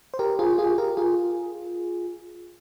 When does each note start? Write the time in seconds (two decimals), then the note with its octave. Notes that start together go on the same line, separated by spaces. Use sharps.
0.14 C5
0.19 G4 A#4
0.39 F4 G#4
0.53 G4
0.58 F4 G#4
0.78 G4 A#4
0.97 F4 G#4